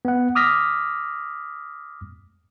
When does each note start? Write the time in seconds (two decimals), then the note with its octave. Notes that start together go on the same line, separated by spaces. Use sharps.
0.05 B3 F#5
0.35 D6 D#6 F6 A#6 B6